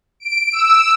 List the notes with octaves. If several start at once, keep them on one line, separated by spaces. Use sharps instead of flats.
D7
E6